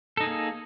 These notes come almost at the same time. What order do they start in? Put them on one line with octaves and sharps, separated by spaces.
A4 D#4 G#4 A#3